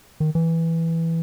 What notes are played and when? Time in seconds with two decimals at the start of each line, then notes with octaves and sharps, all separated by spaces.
0.20 D#3
0.35 E3